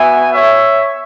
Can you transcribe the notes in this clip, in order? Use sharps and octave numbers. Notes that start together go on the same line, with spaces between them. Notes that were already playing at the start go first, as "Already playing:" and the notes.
Already playing: B3 F#4 E5 G#5
C#5 E5